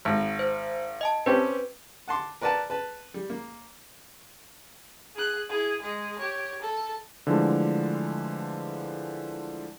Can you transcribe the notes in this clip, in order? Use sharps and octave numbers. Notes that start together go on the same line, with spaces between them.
G#1
C5
D#5 G#5 A5
C4 C#4 G4 B4
F#5 A5 C6 D6
A#4 B4 D5 F#5 A5
B4 A5
G3
A#3
G#4 F#6
E4 G#4
G#3 G#4
G4 C#5
A4
D3 E3 F3 G#3 A3 D4